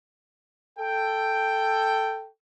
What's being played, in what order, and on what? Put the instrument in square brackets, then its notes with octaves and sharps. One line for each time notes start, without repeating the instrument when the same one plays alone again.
[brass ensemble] A4 G5